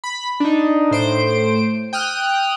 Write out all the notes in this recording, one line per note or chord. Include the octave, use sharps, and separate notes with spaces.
B5
D4 D#4
A2 C5 D7
G5 D#6 F6 F#6